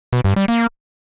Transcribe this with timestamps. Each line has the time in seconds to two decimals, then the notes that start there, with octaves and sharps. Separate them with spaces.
0.13 B2
0.24 G2
0.36 G3
0.48 A#3